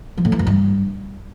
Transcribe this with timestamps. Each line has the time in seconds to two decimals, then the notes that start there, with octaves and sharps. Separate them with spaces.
0.17 F3
0.25 A2
0.32 E3
0.39 F#2
0.47 G2